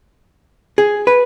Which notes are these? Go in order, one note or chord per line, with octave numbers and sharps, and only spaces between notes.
G#4
B4